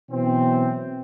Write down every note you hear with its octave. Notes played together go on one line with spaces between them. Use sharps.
B2 E3 F#3 C4